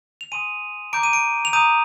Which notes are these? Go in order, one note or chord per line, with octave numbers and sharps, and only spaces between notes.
F7
G#5 C6 D#6 D#7
A#5 D6 G6 D7
D#7
D7
F7
A#5 D#6 G6 D#7